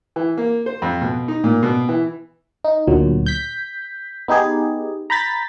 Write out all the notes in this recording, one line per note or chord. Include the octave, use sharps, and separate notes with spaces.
E3
A#3
C5
F2
B2
D#4
A#2
B2
E3
D#4
D2 A#2 F#3
G6 B6
B3 D#4 G4 G#4
A#5 B5 G6 A6 B6